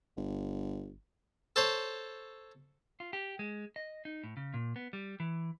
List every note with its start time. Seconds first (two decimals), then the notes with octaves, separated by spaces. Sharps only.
0.17 G1
1.56 A4 C5 C#5
3.00 F4
3.13 G4
3.39 G#3
3.76 D#5
4.05 D#4
4.24 A2
4.37 C#3
4.54 A#2
4.76 B3
4.93 G3
5.20 E3